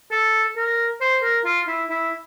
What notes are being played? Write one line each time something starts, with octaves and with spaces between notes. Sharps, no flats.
A4
A#4
C5
A#4
F4
E4
E4